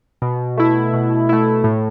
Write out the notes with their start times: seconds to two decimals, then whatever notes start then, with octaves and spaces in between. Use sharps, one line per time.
0.22 B2
0.57 A3 E4
0.93 B2
1.29 A3 E4
1.64 A2